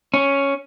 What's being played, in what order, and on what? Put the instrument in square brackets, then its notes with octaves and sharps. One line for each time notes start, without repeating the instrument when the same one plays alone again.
[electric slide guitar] C#4